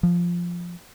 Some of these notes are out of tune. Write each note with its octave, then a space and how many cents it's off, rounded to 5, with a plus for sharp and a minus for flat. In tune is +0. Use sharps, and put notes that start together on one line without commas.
F3 +0